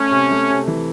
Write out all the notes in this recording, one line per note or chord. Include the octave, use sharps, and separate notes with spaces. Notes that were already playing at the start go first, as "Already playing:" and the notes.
Already playing: A3 C#4
C3
A3
C3
E3